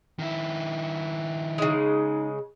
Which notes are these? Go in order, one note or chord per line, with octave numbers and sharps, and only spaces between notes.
D#3 E4
C#3 G#3 D#4